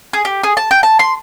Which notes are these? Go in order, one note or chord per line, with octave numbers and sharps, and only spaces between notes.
G#4
G4
G#4
A5
G5
A5
C6